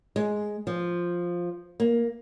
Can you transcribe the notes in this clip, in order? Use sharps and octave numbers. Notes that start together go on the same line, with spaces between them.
G#3
F3
A#3